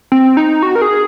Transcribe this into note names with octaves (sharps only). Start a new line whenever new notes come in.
C4
D#4
F#4
A#4
G#4